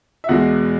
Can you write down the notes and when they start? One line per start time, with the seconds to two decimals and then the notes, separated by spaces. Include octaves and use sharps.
0.24 E5
0.29 E2 B2 G#3 F#4 F#5